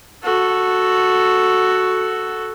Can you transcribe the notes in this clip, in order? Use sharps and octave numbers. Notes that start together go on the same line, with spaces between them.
F#4 A4